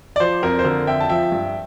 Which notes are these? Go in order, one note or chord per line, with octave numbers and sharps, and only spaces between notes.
D5
F3 C5
F2 A#4
C5
D3 A#4
F2 E5 G5
A5
F3 E5 G5
G2